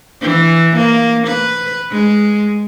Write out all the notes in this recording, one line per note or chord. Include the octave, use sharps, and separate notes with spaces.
E3
A#3
B4
G#3